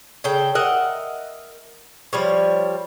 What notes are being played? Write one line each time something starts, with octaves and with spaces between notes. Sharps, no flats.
C#3 A4 G5
A#4 D#5 E5 F#5
F3 G3 C#5